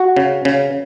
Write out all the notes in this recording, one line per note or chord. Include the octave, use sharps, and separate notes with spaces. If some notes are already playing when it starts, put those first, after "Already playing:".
Already playing: F#4 F#5
C#3
C#3